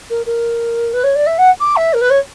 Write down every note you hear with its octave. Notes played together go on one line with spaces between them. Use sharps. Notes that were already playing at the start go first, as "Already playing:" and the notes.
A#4
A#4
B4
C#5
D5
E5
F#5
D6
E5
A#4
B4
C#5